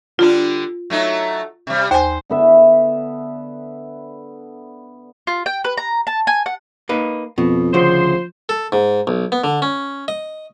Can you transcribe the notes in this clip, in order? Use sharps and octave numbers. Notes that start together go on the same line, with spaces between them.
D3 G3 D4 F4
F#3 A3 D#4
C3 G3
D#2 C5 G#5
D3 B3 E5
F4
G5
B4
A#5
A5
G#5
F#5
A#3 D#4 B4
F2 B2
D2 C#3 F3 C5 C6
A4
G#2
B1
B3
D3
C#4
D#5